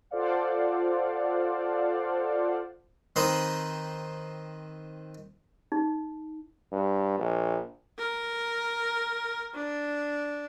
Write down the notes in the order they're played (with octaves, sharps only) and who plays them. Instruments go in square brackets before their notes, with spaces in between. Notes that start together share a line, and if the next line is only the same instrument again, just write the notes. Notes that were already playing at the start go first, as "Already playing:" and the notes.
[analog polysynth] F4 A4 C5 D5 F5 F#5
[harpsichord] D#3 C4 D#4 B4 B5 C6
[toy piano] D#4
[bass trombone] G2
A#1
[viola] A#4
D4